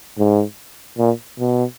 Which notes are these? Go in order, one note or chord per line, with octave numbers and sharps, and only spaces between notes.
G#2
A#2
B2